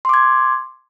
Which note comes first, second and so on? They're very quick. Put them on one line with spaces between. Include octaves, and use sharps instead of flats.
C6 D6 G#6